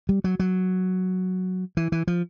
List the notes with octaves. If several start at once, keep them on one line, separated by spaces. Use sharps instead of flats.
G3
F#3
F#3
E3
E3
F3